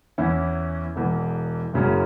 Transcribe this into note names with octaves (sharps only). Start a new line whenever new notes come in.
E2 E3 C#4 E4
E1 E2 E3
F#1 F#2 C#3 F#3 C#4